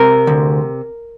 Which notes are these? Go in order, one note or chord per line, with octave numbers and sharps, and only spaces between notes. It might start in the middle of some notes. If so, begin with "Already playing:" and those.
Already playing: C3 A#4
D2